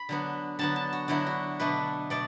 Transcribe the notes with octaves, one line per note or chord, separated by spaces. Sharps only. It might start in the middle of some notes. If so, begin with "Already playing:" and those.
Already playing: B5
D3 F#3 B3
D3 F#3 B3 A5
A5
F#4
D3 F#3 B3 E4
F#4
B2 A3 D4 B4
B2 A3 D5